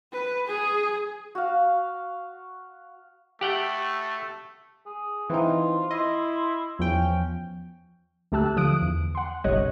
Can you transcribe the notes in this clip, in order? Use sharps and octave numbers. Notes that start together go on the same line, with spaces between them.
B4
G#4
F#4 F5
A3 G4 F#5 G5
G#4
E3 C4 D#4 F4
E4 D#5 C6
E2 F3 C#4 G5
D2 A3 G4 A5 E6 F#6
D3 F3 D#6 F#6 D7
E2
F#5 C6
G1 C2 G3 C#5 D#5 F#6